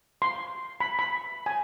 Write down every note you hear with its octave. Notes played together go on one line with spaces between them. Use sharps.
C6
B5
B5
G#5